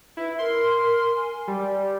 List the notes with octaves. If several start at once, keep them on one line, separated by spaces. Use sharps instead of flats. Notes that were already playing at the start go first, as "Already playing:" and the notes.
E4 B4
A#4 C6
G#5
G3